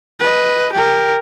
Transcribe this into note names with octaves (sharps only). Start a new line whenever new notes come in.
B4 D#5
G4 A#4